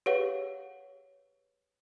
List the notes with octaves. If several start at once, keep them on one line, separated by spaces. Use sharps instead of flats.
G4 G#4 B4 C#5 F5 F#5